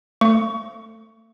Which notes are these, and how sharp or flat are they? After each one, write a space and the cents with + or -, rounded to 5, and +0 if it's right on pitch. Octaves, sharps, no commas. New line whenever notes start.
A3 +25 C#6 +20